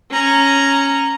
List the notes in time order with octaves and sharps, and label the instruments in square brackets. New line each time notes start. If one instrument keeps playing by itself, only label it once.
[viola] C#4 A#5